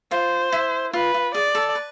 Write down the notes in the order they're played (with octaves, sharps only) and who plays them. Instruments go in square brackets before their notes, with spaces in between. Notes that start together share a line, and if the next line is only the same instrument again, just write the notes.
[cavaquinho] F4 [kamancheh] C5
[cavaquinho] E4
[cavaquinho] F4 [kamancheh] B4
[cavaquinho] F4
[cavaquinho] G#4 [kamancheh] D5
[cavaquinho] A4
B4